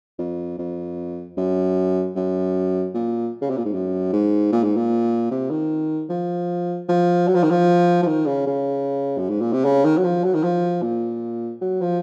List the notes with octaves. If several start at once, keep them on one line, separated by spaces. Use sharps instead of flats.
F2
F2
F#2
F#2
A#2
C#3
C3
A#2
G#2
F#2
G#2
A#2
G#2
A#2
C3
D#3
F3
F3
F#3
F3
D#3
F3
F3
D#3
C#3
C#3
F#2
G#2
A#2
C3
C#3
D#3
F#3
F3
F#3
D#3
F3
A#2
F#3
F3